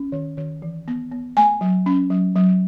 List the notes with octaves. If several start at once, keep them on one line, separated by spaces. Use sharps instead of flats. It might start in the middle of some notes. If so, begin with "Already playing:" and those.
Already playing: C#4
D#3
D#3
E3
B3
B3
A3 G#5
F#3
C#4
F#3
F#3